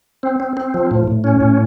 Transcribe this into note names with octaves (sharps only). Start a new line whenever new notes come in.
C4
C4
C4
F3
A2
A2
C#4
A2